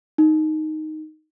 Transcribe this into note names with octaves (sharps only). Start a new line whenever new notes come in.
D#4